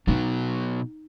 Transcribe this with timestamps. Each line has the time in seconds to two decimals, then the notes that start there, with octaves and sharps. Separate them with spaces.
0.07 B2 F#3 B3 D#4